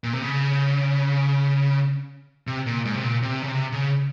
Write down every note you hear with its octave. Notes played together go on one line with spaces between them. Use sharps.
A#2
C3
C#3
C3
A#2
G#2
C3
A#2
C3
C#3
C3
C#3